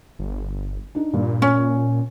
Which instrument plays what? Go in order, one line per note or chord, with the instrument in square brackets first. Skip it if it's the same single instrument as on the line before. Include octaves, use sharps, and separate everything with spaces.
[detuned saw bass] G1
[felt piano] D4 D#4
[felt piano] G2 [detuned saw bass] A#2
[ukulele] C#4 [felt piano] G#5